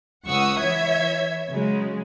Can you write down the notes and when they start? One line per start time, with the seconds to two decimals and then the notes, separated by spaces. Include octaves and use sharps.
0.25 C#2 F#5 C#6 D#6 E6
0.61 E3 C#5 E5 G#6
1.50 C#3 F#3 G#3